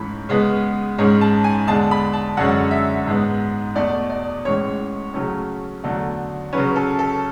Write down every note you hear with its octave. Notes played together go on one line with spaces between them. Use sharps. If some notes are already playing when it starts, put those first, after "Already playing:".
Already playing: G#2 E3 A3 C#4 B5
C#3 G#3 B3
G#2 G#3 C#4
A5
G#5
E2 D3 G#3 A5
B5
A5
F#2 D3 G#3 C#4 F#5
E5
G#2 G#3 B3
E2 B2 A3 D5
D5
A2 E3 G#3 C#4 C#5
C#3 F#3 A3 C#4
E2 D3 F#3 A3
C#3 F#3 C#4 B4
A4
A4